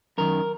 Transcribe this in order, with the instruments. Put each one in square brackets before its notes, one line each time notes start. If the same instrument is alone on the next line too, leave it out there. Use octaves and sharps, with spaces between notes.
[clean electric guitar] F#2 D#3 A#4